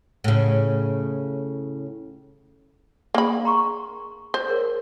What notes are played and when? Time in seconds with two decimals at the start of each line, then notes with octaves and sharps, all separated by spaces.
0.24 A2 C#3
3.14 A#3 D4 G#4 B5
3.45 A#5 C6 C#6
4.34 C5
4.48 G#4 A#4 C#5